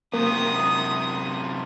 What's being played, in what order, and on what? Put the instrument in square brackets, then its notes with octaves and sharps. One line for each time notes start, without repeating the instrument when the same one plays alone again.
[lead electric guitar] F#2 C3 [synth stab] A#3 [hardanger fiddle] D#6